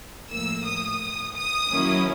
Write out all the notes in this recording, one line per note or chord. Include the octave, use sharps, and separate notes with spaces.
A2 F3 A#3 E6
D#6
D#6
D#3 F#3 A#3 C#4 E4